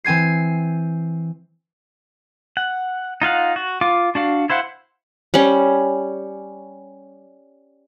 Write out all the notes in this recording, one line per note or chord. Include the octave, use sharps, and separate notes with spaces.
E3 C4 G#5 G#6 C7
F#5
D#4 F4 F5 F#5
F#4
F4 F5 D6
D4 F#4 F5
E4 C5 F5 F#5
G3 C#4